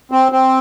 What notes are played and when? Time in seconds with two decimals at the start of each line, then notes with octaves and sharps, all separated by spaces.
0.12 C4
0.32 C4